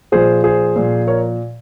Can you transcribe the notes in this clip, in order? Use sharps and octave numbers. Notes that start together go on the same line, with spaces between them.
A#2 F3 G#4 C5
G#4 C5
A#2 F3
A#4 C#5